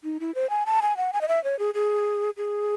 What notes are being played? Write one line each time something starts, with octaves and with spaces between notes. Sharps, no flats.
D#4
E4
C5
G#5
A5
G#5
F#5
G#5
D#5
E5
C#5
G#4
G#4
G#4